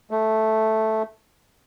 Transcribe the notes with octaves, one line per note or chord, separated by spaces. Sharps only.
A3